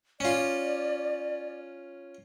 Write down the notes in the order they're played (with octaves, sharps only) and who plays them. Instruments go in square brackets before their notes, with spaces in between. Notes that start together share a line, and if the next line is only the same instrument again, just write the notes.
[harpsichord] C#4 F4 [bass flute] D5